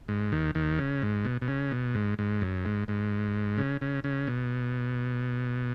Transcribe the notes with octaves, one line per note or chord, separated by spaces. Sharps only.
G#2
D#2 D#3
D#2 D#3
C#3
G#2
B2
B2
C#3
B2
G#2
G#2
F#2
G#2
G#2
C#3
C#3
C#3
B2